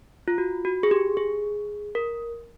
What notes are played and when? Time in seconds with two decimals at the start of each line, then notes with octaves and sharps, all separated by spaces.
0.28 F4
0.38 F#4
0.65 F#4
0.83 G#4
0.91 G4
1.17 G#4
1.95 A#4